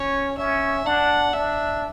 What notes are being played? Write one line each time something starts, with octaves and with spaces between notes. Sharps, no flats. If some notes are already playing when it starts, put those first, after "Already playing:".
Already playing: C#4 C#5
C#4 E5
D4 F#5
D4 E5